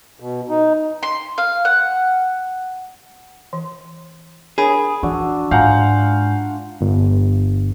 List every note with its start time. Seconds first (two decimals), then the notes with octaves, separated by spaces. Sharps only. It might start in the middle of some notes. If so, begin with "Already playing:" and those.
0.20 B2
0.49 D#4
1.03 C6
1.38 F5
1.65 F#5
3.53 E3
4.58 D4 G#4 A#4 C#5 G#5 B5 D#6
5.03 E3 D4 F#4 E5
5.51 G#2 F4 F5 F#5 G#5 A#5 G6
6.81 G1